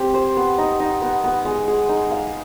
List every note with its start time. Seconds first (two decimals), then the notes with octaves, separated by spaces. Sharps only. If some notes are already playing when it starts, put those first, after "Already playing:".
Already playing: C4 G4
0.14 C5
0.37 B3
0.58 D#4
0.80 D#4
1.02 B3
1.24 B3
1.45 G#3
1.68 G#4
1.89 D#4
2.11 F5